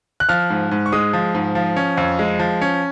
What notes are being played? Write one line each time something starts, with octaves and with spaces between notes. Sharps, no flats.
F#6
F3 F6
G#2
G#2
C#6
G#3 D#6
F3
G#2
F3
C#4
F2
G#3
F3
C#4